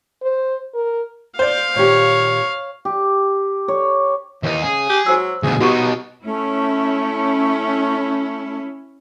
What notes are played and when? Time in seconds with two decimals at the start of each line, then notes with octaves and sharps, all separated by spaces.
0.22 C5
0.74 A#4
1.39 C5 D5 F5
1.76 A#2 D#3 G4 C#5
2.85 G4
3.68 C#5
4.43 D#2 E3 D#4
4.62 C#3 G#4
4.89 G4
5.06 F#3 F#4 C5 E6
5.43 D2 B2 G#4
5.61 B2 B3 D#4 F#4 G4 C#6
6.24 A3 C#4 E4